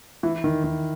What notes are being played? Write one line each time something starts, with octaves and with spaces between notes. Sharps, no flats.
E3
D#3
D#3